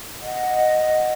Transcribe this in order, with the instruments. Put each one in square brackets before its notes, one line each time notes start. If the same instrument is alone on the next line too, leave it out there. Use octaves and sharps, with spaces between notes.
[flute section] D#5 F#5